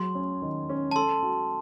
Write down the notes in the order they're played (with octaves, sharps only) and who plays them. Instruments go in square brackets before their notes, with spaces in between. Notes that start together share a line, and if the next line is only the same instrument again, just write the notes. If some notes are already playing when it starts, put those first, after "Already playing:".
Already playing: [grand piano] F#3 G#4 [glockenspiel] C6
[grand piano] C#4
D#3
C#4
[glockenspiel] A5
[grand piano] A4 [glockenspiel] C6
[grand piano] F#4